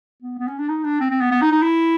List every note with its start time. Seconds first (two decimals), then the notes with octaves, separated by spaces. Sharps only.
0.23 B3
0.39 B3
0.48 C#4
0.58 D4
0.69 D#4
0.84 D4
1.01 C4
1.11 C4
1.21 B3
1.32 B3
1.42 D#4
1.52 D#4
1.62 E4